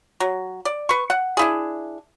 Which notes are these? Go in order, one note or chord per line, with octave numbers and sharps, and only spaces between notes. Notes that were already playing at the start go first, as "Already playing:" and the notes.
F#3
D5
B4 C#6
F#5
D4 E4 G#4